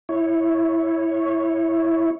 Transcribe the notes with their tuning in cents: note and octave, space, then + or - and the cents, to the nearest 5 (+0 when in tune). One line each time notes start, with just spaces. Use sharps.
E4 +0 C#5 -10